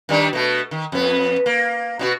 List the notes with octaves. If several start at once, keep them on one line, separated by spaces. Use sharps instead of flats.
D#3 G3 D4
B2 A3
D#3
F2 B3
A#3
B2 D4 F#4